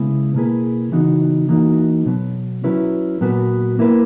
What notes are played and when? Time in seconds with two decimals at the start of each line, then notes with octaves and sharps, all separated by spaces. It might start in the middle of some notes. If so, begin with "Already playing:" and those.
Already playing: C#3 G#3 B3 E4 B4
0.34 B2 A#3 E4 G#4 B4
0.92 C#3 E3 B3 D#4 F#4
1.49 E3 A#3 D#4 F#4
2.06 B2 F#3 B3
2.64 F#3 C#4 E4 B4
3.21 A#2 F#3 B3 F#4 B4
3.79 A#3 E4 B4